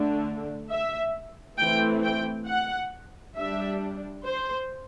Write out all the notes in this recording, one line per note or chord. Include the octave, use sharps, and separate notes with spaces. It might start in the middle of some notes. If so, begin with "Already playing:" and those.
Already playing: D3 A3 D4
E5
E3 A3 C4 G5
G5
F#5
G3 D4 E5
C5